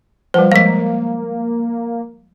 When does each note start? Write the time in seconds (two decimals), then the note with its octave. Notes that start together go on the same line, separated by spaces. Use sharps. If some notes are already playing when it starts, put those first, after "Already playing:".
0.34 F3 G3 B4 C5 F#5
0.52 F3 G#3 A#3 F5 B6